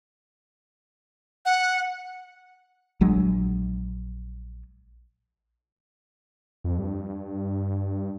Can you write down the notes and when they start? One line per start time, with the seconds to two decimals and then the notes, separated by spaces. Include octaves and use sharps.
1.45 F#5
3.01 A#1 F#3 G#3 D4
6.64 F2
6.78 G2